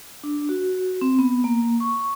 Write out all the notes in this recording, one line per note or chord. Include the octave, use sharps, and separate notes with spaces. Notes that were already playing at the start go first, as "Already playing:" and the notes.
D4
F#4
C4
B3
A#3
C#6